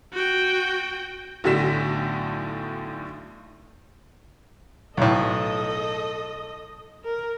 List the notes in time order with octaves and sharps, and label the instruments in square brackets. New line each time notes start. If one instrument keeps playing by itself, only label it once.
[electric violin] F#4 G5
[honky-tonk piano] B1 A2 D3 A#6 B6 E7
[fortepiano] B1 A2 [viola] A4 D#5
[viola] A#4